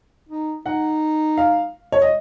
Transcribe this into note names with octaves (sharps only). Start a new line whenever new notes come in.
D#4
D#4 F#5
F5
C#5
D#5